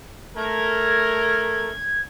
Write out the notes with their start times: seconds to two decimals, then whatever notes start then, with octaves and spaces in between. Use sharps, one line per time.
0.36 A3 A#4 G#6